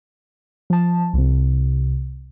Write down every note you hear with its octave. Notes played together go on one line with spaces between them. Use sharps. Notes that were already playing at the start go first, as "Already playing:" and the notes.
F3 A5
C2 C3